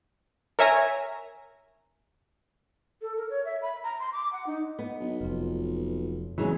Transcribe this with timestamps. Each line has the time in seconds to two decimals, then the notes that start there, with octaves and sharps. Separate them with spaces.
0.59 A#4 C#5 E5 G#5 A#5
3.02 A4
3.17 A#4
3.30 C#5
3.45 E5
3.62 B5
3.84 A#5
4.00 C6
4.12 D6
4.33 F#5
4.47 D#4
4.79 B3 D#5
5.00 B1
5.21 F1 C4 F4
6.38 C#3 E3 F#3 G#3 B3 C4 G#4